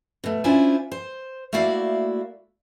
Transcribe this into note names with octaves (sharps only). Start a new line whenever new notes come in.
B2 A3
C#4 D4 E4 F4 C5 G#5
C5
A3 A#3 E4 F#4 D5 F5